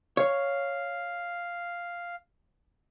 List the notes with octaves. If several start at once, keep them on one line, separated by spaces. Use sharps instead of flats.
C#5 F5